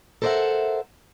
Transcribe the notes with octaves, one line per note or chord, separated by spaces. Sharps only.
A4 A#4 C5 D5 E5 F#5